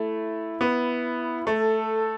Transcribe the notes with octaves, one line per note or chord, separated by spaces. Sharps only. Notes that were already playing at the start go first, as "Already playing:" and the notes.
Already playing: A3 E4
B3
A3 A4